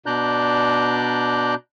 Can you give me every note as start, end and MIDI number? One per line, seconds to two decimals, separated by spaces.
0.06 1.54 47
0.06 1.54 62
0.06 1.54 74
0.06 1.54 82
0.06 1.54 90
0.06 1.54 91